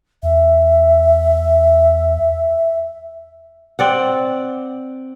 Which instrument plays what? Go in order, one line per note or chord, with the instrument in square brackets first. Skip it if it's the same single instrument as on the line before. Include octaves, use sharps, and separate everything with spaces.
[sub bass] E2 [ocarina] E5
[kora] C4 D5 F#5